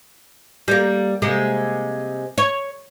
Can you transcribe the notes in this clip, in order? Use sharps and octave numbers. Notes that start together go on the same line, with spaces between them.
G3 A#3
C3 G#3 A#3
C#5